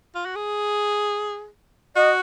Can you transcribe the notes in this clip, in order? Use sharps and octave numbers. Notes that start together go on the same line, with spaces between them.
F4
F#4
G#4
F#4 D#5